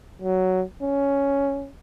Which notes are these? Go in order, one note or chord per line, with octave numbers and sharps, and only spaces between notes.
F#3
C#4